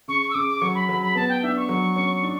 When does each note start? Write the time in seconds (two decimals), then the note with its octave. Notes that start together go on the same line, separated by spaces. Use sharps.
0.08 C#3 C#6
0.22 C#6
0.30 E6
0.34 C#3 D6
0.49 D6
0.61 F#3 C#6
0.75 B5
0.88 F#3 B5
1.02 B5
1.15 B3 A5
1.29 G5
1.43 D4 E5
1.57 C#6
1.69 F#3
1.96 C#4
2.23 D4